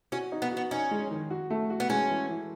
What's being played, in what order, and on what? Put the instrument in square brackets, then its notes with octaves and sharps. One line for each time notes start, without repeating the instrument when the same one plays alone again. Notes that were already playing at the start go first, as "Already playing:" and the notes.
[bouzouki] C#4 [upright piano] F#4
[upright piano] D#4
[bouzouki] B3
[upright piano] F#4
[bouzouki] B3
[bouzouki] C#4 [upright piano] D#4
[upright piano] G#3
D#3
F#4
A3
F#4
[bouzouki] B3
[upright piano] G#3 [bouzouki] C#4
[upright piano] E3
E3